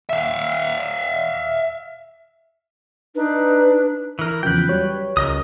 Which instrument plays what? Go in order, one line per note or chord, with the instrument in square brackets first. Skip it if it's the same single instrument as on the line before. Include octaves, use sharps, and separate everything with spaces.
[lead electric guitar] E5 F5
[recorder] D4 [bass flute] D#4 [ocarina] B4
[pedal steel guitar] E3 A#4
[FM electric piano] E2 C#3 F3 [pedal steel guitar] B4 G5
[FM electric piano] F#3 G3 C#5
[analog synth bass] C#2 [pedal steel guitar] A#4 D#5 D#6